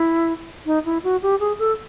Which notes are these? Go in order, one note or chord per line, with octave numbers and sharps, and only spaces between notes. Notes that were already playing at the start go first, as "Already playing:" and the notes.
Already playing: E4
D#4
E4
F#4
G4
G#4
A4